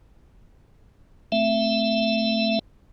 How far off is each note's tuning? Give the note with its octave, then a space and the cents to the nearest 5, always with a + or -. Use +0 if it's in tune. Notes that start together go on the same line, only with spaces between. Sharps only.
A3 +0 C4 +0 E5 +20